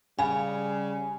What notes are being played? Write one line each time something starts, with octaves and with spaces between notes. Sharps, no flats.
C#3 G3 F5 G#5 B5